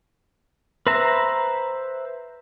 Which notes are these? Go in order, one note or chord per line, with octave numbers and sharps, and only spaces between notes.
B4 C5 E5 A#5